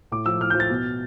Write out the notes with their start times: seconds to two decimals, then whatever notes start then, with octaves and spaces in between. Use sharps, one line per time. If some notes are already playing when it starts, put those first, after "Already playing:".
0.12 A2 D6
0.26 F3 E6
0.40 A2 F6
0.50 F3 G6
0.60 A6
0.69 B2